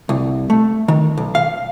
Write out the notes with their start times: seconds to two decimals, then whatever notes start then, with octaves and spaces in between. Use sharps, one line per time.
0.09 C2
0.50 A3
0.88 D#3
1.17 B1
1.35 F5